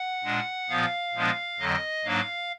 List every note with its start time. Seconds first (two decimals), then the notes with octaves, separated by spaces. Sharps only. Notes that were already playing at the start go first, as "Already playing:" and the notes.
Already playing: F#5
0.24 A#2 G#3 D4
0.69 A#2 F3 B3 F5
1.14 A#2 F3 G#3 B3 D4
1.59 F2 D3 F#3 D#5
2.05 G#2 F#3 A#3 D4 F5